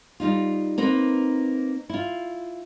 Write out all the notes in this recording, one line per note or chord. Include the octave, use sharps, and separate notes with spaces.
G3 D#4 F4
A#3 C4 D#4 B4
E4 F4